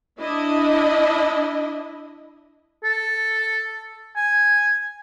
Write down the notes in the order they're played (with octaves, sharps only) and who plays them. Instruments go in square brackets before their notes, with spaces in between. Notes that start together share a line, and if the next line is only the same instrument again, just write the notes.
[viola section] D4 E4 D#5
[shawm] A4
G#5